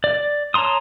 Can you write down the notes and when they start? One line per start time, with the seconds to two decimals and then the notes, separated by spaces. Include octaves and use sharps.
0.04 D5
0.54 C#5 A5 A#5 C6 D#6